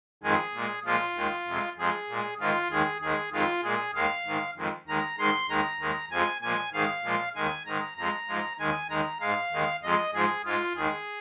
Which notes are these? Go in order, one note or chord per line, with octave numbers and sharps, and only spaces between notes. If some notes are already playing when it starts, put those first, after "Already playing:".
F2 D#3 G#3 G#4
A#2 G#3
A#2 F3 G#3 F4
D#2 D#3 G#3
F2 C3 G#3
F2 F3 G#3 G#4
A#2 G#3
G#2 D#3 G#3 F4
D#2 D#3 G#3 G#4
D#2 D#3 G#3 G#4
F2 D#3 G#3 F4
A#2 G#3 G#4
D#2 D#3 G#3 F5
G#2 D#3 G#3
F2 D#3 G#3
D#2 D#3 G#3 A#5
G#2 D#3 G#3 C6
D#2 D#3 G#3 A#5
D#2 D#3 G#3
F2 F3 G#3 G#5
A#2 F3 G#3 G#5
G#2 D#3 G#3 F5
A#2 F3 G#3
D#2 D#3 G#3 G#5
G#2 D#3 G#3 A#5
F2 F3 G#3 A#5
G#2 F3 G#3
D#2 D#3 G#3 G#5
D#2 D#3 G#3 A#5
G#2 G#3 F5
D#2 D#3 G#3
F2 F3 G#3 D#5
G#2 F3 G#3 G#4
G#2 G#3 F4
D#2 D#3 G#3 G#4